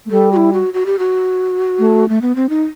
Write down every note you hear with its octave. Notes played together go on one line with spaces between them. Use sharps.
A3
G3 A4
F#4
E4
F#4
F#4
G4
F#4
A3
A3
B3
C4
D#4